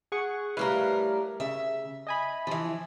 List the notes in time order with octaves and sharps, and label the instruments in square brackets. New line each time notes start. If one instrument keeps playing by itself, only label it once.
[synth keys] G#4 F#5 C#6
[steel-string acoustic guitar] A2 G3 A#4 [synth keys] B4 F5
[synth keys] C#3 [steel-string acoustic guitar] E5
[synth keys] D#5 G#5 B5
[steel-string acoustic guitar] E3 F3